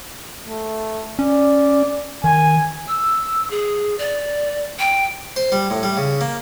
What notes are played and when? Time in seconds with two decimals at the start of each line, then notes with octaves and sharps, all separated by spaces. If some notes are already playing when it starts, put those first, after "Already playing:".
0.48 A3
1.19 C#4 D5
2.24 D#3 G#5
2.88 E6
3.51 G#4
3.99 D5
4.79 G5
5.36 C5
5.52 G3
5.70 A2
5.83 G3
5.97 C#3
6.21 A#3